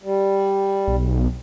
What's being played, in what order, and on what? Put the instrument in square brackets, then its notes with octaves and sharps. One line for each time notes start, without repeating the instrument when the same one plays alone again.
[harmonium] G3
[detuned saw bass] B1